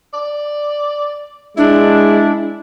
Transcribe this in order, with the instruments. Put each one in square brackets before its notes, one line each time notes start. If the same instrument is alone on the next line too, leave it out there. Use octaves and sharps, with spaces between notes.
[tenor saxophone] D5
[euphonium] G#3 [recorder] D4 [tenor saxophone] E4